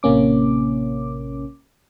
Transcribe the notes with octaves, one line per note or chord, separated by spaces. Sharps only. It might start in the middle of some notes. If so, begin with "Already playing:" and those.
A1 C3 A#3 C#4 D6